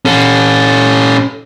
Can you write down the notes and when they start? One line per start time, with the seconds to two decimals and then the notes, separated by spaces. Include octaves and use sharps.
0.05 C#4 A4